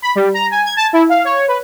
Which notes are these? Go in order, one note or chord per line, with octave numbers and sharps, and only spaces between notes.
B5
G3
A#5
G#5
G#6
A5
E4
F5
C#5
B4